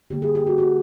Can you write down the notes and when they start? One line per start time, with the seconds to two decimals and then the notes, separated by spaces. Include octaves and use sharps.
0.10 D3 G3 A#3 G4
0.22 G#4
0.35 G4
0.47 F#4
0.58 F#4